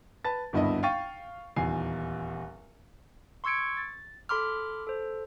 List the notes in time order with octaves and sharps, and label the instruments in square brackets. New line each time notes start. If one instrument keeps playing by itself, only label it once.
[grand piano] B4 A5 A6
G#1 D2 G2 B3 E4 D#5
F5 G5 C#6 A6 D#7
D#1 E2 G#5 C7
[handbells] C6 C#6 E6 G#6 C#7 D7
A6
A4 B5 C6 D6 F6
A4 C5